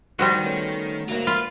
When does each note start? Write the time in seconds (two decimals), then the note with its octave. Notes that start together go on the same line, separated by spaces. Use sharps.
0.19 D#3 G3 C4 F#4
0.43 A3 B3 C#4
1.09 D2 G#2 F#3 A#3
1.27 F4 B4